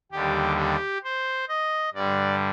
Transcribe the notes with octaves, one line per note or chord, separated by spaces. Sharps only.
D#2 D3 G3 G4
G4
C5
D#5
G2 D3 G3 D5